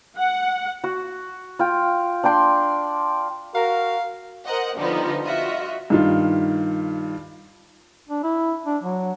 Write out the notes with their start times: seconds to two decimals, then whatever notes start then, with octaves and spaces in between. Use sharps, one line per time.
0.19 F#5
0.84 F#4
1.59 F4 G5
2.23 D4 D5 G5 C6
3.55 F#4 A#4 F5
4.45 A#4 C5 D#5 F#5
4.77 D3 F3 G3 B3 D#4
5.23 F4 F#4 D#5 E5
5.90 G2 D#3 F4
8.09 D4
8.24 E4
8.66 D4
8.83 F#3